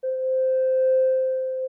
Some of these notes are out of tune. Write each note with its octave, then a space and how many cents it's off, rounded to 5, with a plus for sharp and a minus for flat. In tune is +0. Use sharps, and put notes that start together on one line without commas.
C5 -10